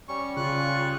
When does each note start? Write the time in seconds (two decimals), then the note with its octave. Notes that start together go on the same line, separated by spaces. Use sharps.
0.08 G3 C#4 C#6
0.37 C#3 F4 C#6 F#6